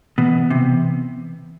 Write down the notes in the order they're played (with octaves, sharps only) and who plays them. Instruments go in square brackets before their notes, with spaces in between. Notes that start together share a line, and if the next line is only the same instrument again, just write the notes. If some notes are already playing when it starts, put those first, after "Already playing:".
[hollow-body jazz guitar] B2 [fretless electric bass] E3
[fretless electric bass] B3
[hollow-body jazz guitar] C3
[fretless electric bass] E3